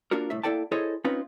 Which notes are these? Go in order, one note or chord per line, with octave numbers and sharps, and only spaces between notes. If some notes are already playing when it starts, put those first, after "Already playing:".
A#3 D4 F4 F#4 A#4
C2 A2 E5
A#3 E4 A4 D5 G5 A5
E4 G#4 A4 C5 C#5 D#5
C4 C#4 D#4 F4 B4 C#5